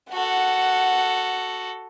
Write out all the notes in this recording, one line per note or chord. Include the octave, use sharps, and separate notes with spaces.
F#4 A4 F#5